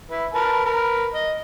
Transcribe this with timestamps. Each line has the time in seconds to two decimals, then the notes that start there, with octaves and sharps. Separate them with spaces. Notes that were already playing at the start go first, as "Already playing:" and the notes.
0.10 E4 B4
0.34 A#4 B4 A5
0.65 A#4 B4
1.14 D#5